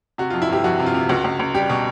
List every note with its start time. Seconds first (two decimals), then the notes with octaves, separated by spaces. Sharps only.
0.18 C3 F#4
0.30 F2 F4
0.42 E4
0.49 G1 G4
0.64 F2 F#4
0.79 C3
0.86 F4
0.94 C3
1.09 C#2 F#4
1.24 C#2
1.39 C#2
1.54 G3 G4
1.69 B2